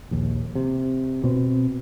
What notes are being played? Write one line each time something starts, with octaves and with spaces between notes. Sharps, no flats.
A#1 D#2
C3
B2 C4